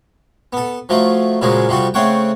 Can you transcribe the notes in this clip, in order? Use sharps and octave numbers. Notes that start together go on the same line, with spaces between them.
B3 A4
F3 F#3 A3 F4
A#2 C#3 F3 F#3 G#3 C#4
C3 F3 G3 F#4 A4
C#3 A3 C4 C#5 F#5 G5